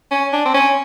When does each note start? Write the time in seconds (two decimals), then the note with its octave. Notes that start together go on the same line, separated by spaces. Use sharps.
0.11 C#4
0.33 D4
0.45 C4
0.54 C#4